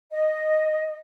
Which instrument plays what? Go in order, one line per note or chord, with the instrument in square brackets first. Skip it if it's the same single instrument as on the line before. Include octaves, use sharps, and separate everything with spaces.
[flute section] D#5